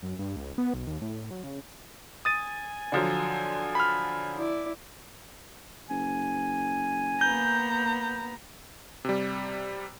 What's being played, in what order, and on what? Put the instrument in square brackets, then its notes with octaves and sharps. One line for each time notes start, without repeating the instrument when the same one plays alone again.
[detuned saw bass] F#2
G2
C#2
B3
B1
D#2
A2
F#3
C#3
[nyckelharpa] G#5 [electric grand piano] D#6 A6 D#7
[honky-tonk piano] D3 F3 F#3
[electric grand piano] B5 F6
[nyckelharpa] E4 D5
[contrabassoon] F#1 [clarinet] G#5
[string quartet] A#3 B3 A#5 [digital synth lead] G6
[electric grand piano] C3 G3